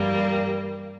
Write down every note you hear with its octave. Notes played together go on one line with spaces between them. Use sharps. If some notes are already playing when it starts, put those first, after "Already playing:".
Already playing: G2 E3 G3 A#3